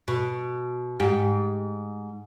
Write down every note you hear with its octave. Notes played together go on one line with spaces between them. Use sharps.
B2
G#2 G4